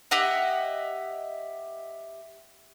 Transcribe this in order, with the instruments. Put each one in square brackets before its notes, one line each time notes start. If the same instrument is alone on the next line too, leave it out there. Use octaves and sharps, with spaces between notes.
[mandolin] G4 D#5 E5 F#5